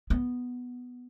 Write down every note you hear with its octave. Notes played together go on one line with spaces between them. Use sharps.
B3